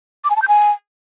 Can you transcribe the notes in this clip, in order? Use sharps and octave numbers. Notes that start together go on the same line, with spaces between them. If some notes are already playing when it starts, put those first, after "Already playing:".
D6
G#5
A5
G6
G#5